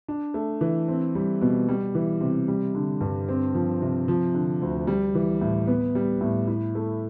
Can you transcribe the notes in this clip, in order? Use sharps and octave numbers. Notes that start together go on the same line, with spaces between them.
D4
A3
E3
C4
G3
B2
G3
E3
C3
G3
D3
G2
C4
F3
C3
F3
D3
D2
G3
E3
A2
B3
G3
A2
E4
A3